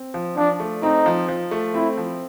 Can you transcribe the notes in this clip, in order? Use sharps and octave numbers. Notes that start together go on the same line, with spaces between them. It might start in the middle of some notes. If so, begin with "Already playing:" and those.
Already playing: C4
F3
F3 D4
A3
C4 D#4
F3
F3
A3
C4 E4
F3